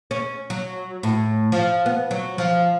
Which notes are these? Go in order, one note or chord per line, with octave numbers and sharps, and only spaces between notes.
C#4
F#3
A2
F3
B3
F#3
F3